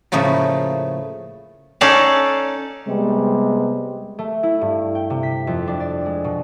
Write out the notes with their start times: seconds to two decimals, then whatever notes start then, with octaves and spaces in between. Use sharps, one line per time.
0.12 A2 C#3 F3 A3 A#3
1.81 C#4 D#4 A4 C#5 D5 F5
2.87 C3 G3 G#3 B3
4.19 A3
4.43 E4
4.61 G2
4.95 G5
5.10 C3
5.23 B6
5.47 F2
5.67 D4
5.80 D5
6.06 G#3
6.24 B2